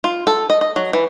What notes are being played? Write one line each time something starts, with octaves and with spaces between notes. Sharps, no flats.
F4
A4
D#5
D#5
F#3
E3